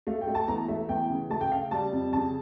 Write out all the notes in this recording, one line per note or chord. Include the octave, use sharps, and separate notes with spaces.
A3 F5
G5
A3
A5
E2 A#5
A3 E5
E2 G5
C#3
A3 A5
G5
C#3 F5
G3 A5
F2
C#3 A5